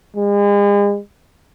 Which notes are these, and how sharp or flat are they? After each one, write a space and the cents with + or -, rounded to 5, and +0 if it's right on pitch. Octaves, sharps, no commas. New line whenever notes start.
G#3 -40